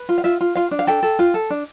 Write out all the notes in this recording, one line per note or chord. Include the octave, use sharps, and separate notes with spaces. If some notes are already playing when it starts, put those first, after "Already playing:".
Already playing: B4
F4
F5
F4 E5
F4
F4 F5
D4
F5
A4 G5
A4
F4
A4
D4